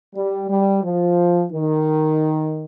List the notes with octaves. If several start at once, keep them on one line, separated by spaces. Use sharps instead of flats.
G3
G3
F3
D#3